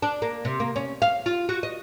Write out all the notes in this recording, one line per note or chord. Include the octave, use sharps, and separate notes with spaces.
D4
A#3
C3
A#3
C#4
F5
F4
F#4
D#5